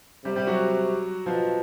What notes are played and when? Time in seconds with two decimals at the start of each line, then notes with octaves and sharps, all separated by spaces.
0.25 C3 G3 G4
0.36 G3 G4
0.47 F#3 F#4
1.26 B2 F3 F4